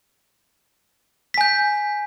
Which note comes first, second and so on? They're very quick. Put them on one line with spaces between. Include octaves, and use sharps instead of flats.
B6 G#5 G6